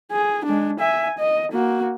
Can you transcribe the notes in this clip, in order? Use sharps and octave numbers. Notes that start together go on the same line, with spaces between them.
G#4
G#3 D4
E5 G#5
D#5
A#3 F#4